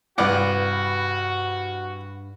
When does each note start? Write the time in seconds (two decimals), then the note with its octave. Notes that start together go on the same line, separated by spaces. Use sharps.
0.18 C2 G2 F#4 B4 D5 F#5